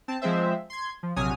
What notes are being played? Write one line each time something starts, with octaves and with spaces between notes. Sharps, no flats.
C4 A5
F3 G#3 C4 C5 E5
C6 G#6
F3
A#1 C3 F#3 G#5 D#6 F6